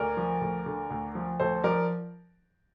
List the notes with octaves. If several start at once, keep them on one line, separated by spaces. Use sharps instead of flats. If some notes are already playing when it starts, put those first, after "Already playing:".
Already playing: D2 A#4 D5
F3
D2
D3
D2
F3
D2 A4 C5
F3 A#4 D5